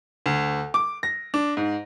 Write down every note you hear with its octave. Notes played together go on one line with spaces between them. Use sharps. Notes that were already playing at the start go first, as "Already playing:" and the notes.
D2
D6
A#6
D4
G#2